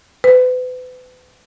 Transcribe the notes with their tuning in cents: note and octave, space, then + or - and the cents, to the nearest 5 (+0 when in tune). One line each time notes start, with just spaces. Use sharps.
B4 +40